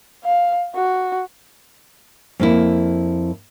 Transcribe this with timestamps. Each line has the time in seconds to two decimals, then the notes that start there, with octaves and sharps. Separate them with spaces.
0.24 F5
0.75 F#4
2.40 F2 A#3 E4